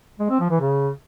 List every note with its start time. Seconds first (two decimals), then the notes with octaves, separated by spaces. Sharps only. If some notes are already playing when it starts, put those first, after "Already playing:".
0.20 G#3
0.30 C4
0.40 F3
0.50 E3
0.61 C#3